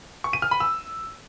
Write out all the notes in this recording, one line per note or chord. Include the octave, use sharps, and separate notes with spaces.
C#6
D#7
F6
B5
E6